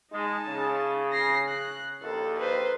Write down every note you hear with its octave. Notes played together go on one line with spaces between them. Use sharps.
G#3 D#4 A5
C#3
A#6 C7
F#6
A#1 D#2 A4
B4 C5